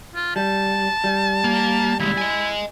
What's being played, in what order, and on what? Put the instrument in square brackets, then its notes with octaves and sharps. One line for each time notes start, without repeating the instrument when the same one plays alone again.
[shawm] F4
[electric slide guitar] G3 [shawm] A5
[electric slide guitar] G3
[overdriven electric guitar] A#3
[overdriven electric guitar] D#2 G#3 [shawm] E4
[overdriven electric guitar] D#5 G#5